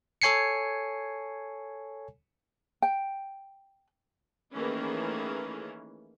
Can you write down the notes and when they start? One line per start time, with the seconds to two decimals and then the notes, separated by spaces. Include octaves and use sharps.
0.22 A4 C#5 G#5 C7 C#7
2.82 G5
4.53 D#3 E3 A3 A#3 C#4 G#4